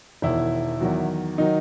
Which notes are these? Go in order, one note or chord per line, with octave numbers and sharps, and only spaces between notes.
E1 E2 D#3 E4
E2 D#3 F#3
D#3 F#3 D#4